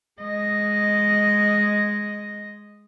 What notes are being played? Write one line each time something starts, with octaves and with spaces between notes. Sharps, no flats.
G#3 D#5